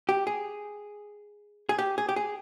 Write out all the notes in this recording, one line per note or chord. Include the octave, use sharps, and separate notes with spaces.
G4
G#4
G#4
G4
G#4
G4
G#4